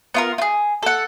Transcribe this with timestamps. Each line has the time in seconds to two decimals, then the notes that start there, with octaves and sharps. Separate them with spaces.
0.14 B3 F4 A#4
0.38 F4 G#4
0.83 A4 F#5